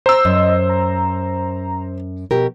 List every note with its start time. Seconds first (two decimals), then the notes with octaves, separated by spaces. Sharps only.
0.06 C5 A#5 E6
0.25 F#2 D#5
0.69 A#5
2.31 B2 F3 G4 A#4